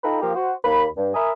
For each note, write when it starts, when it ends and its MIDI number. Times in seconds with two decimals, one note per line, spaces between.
0.04 0.17 63
0.04 0.17 65
0.04 0.17 69
0.04 0.17 79
0.04 0.17 82
0.04 0.17 83
0.22 0.34 53
0.22 0.34 58
0.22 0.34 67
0.22 0.34 70
0.22 0.34 77
0.36 0.53 66
0.36 0.53 72
0.65 0.86 39
0.65 0.86 58
0.65 0.86 83
0.97 1.09 43
1.14 1.32 70
1.14 1.32 76
1.14 1.32 80
1.14 1.32 82
1.14 1.32 83
1.14 1.32 87